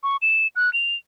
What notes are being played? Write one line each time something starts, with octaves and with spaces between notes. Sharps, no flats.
C#6
E7
F#6
F7